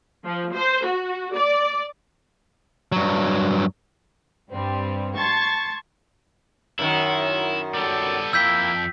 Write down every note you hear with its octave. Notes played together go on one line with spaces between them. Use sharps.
F3
C5
F#4
D5
G2 F#3
G2 G3 C4
A5 C6 C#6 G#6 A6
F#2 D#3 E4
G3 B3 A4 D5
F2 A#3 E4 G5 E6 G6 B6